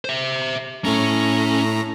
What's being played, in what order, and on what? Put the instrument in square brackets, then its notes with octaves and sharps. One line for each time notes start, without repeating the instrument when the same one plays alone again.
[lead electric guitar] C5 E5
[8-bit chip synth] A2 A3 A#5 [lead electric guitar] C#4